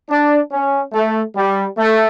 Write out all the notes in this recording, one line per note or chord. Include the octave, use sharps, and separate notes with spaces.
D4
C#4
A3
G3
A3